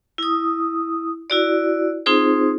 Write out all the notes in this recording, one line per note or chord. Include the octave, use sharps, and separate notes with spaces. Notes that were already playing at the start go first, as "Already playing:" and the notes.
E4 D#6
E4 F#4 D5
C4 D#4 F4 G#4 C5